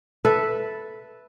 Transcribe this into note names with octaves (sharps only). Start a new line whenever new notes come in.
A4 B4 E5